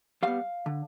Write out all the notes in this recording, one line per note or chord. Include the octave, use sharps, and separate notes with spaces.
G3 B3 F5
D3